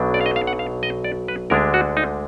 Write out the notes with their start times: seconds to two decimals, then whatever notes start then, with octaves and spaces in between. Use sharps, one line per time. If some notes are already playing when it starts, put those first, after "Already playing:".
Already playing: B1 B2 F#3 D4
0.14 D5
0.21 F5
0.26 D#5
0.36 F5
0.47 F#5
0.59 F5
0.83 D#5
1.04 D5
1.28 B4
1.50 D2 D3 G#3 D4 A#4
1.74 F#4
1.97 D#4